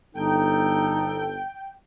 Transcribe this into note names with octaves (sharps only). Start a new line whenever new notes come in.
G1 D#4 A4 G5